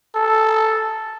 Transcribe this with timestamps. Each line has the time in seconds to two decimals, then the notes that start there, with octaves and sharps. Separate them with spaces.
0.15 A4